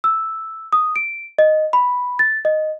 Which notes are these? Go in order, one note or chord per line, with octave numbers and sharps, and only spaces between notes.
E6
D#6
D7
D#5
B5
A6
D#5